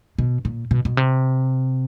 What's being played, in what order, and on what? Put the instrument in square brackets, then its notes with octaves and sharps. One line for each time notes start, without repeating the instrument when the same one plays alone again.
[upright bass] B2
A#2
B2
B2
C3